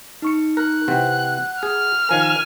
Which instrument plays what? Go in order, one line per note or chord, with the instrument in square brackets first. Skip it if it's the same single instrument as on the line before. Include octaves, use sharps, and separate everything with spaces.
[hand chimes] D#4 C#6 C#7
[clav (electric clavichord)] A#4 [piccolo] F#6
[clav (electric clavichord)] C3 E3 C4 [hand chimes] F#5
[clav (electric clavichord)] G#4 [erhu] F6
[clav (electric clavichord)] D#3 F3 A#4 [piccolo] G#5